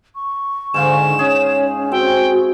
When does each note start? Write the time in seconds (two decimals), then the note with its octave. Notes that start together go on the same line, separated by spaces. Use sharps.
0.15 C#6
0.74 G#2 D3 F4 F5 E7
1.19 C#4 G#4 C#5
1.92 C4 F#4 G5